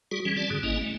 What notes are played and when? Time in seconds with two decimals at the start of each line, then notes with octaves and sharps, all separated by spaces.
0.11 G3 F#4 G#4
0.25 E3 G3 C#4
0.37 C4 D5 A5
0.50 G#2 D3 G#4
0.63 G#1 A#3 C#4 E4 D#5
0.81 A3